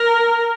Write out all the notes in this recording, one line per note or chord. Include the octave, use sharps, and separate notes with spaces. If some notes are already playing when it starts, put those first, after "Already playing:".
Already playing: A#4